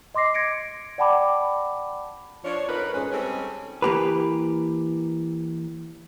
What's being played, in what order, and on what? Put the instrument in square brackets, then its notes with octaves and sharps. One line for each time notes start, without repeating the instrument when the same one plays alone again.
[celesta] D#5 C6 D6 A#6 C7
G#6 A#6 C#7 D7
D5 F#5 G5 A5 B5 D6
[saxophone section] F3 D4 C#5
F2 D#4 A#4 B4
G#2 C#4
G3 G#3 C4 C#4 D#4 A4
[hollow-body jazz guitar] E3 A#3 G4 B4